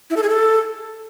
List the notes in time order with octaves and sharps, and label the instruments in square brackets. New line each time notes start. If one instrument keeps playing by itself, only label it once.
[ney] E4
A4
G#4
A4